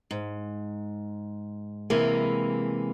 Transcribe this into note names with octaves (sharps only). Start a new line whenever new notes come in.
G#2
C3 E3 G#3 A#3